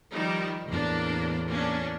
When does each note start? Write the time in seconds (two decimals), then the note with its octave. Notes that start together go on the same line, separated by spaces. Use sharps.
0.12 D#3 F3 G3 D#4
0.68 E2 A2 A#3 D4
1.50 A#3 C#4 D4